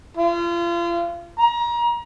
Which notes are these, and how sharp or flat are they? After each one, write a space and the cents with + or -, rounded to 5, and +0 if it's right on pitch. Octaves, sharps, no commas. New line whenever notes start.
F4 -35
A#5 +30